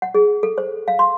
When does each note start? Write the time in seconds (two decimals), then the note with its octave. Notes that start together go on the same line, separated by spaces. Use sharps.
0.02 F#5
0.14 G#4
0.43 A4
0.58 C5
0.88 F5
0.99 C6